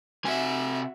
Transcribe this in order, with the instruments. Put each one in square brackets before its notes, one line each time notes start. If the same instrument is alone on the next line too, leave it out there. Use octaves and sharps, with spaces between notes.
[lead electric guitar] C3 G#5 [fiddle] F#4 E5